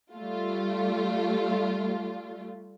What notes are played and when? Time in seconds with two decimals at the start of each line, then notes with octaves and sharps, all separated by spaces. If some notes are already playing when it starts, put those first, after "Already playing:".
0.14 G3 A3 F4